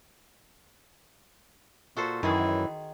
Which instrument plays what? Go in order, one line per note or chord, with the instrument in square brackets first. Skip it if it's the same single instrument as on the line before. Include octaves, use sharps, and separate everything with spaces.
[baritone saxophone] A#2 [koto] F#4 A4 C5
[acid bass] F#2 [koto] D#3 G#4 [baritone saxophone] E3